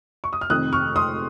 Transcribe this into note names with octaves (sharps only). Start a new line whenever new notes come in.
C#6
D#6
F6
F1 F2 D#3 D#6 F#6
C#6 F6
C6 D#6